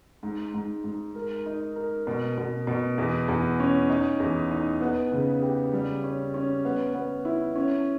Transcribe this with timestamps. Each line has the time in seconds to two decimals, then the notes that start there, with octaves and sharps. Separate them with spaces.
0.23 G#2
0.54 G#2
0.84 G#2
1.15 A#4
1.46 D#4
1.76 A#4
2.07 B2
2.38 B2
2.67 B2
2.98 E2
3.28 E2
3.60 C#4
3.90 D#4
4.20 E2
4.51 D#4
4.81 B3
5.12 C#3
5.42 G4
5.73 G3
6.04 C#4
6.34 C#4
6.65 B3
6.94 B3
7.25 E4
7.56 C#4